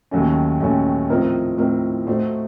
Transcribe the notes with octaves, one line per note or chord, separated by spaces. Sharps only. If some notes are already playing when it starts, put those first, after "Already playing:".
D#2 D#3 F#3 A3 C#4
D#2 D#3 F#3 A3 C#4
A2 F3 C4 D#4 A#4
A2 F3 C4 D#4 A#4
A2 A3 D#4 F#4 C5